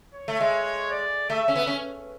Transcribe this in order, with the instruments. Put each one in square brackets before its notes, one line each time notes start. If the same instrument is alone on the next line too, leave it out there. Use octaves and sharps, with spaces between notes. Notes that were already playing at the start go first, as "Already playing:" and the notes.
[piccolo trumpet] C#5
[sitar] A3
G#3
[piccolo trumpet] D5
[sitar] A3 [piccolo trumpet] E5
[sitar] C#4
B3
C#4